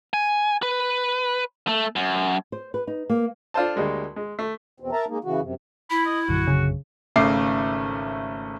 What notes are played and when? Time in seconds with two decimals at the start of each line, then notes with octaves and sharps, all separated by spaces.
0.13 G#5
0.63 B4
1.68 A3
1.96 F#2
2.52 C5
2.74 B4
2.87 D#4
3.10 A#3
3.54 D4 F4 A4 C5 A5
3.76 D2 G3 G#3 A#3
4.16 G#3
4.39 A3
4.80 E2 B2 C4
4.92 A#4 E5 A5 A#5
5.08 G#3 A#3 D#4
5.24 C#3 E3 F#4
5.41 F#2 C3
5.90 E4 B5
6.06 D#5
6.28 A#1 F#2 D3 F#4
6.47 C#3
7.16 G#1 C#3 A3 D6 C7